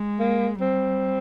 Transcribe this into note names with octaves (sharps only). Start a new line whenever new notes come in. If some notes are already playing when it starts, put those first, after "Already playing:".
Already playing: G#3
A#3
G3 C4